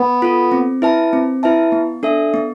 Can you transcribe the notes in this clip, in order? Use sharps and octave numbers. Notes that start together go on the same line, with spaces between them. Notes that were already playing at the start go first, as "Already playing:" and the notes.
Already playing: B3
F4 A4
C4
E4 B4 E5 A5
C4
E4 B4 E5 A5
B3
D4 A4 E5
B3